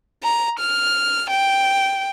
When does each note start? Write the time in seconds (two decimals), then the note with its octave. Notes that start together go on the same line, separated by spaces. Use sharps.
0.23 A#5
0.60 F6
1.30 G5